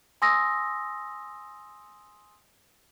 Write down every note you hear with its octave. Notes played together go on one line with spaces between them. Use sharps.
G#5 C6 D#6 E6 A#6